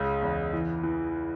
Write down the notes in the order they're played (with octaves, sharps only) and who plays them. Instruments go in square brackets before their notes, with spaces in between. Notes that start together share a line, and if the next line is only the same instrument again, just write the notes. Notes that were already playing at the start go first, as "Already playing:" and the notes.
Already playing: [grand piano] C#2 C#3
E2
E3
E3